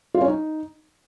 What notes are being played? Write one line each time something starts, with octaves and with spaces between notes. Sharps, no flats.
F4
C#4
D#4